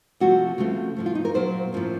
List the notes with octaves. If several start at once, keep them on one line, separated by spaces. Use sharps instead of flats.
C3 F3 A3 F#4
C#3 F3 A3 C4
A2 F3 A3
F4
D#4
A#4
A#2 F#3 A#3 C5
A2 F3 A#3 C#4